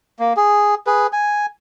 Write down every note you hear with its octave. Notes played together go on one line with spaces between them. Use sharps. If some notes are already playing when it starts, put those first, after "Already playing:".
A#3
G#4
G#4 B4
G#5